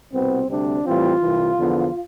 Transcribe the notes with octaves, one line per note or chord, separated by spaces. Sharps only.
C2 B2 B3 C4
D2 C3 G3 C4 D4
A2 E3 G3 C4 F4
C2 C3 E3
E2 D3 F3 B3